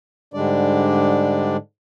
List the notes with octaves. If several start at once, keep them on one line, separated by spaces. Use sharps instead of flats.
G#2 D3 G3 G#3 D4 D5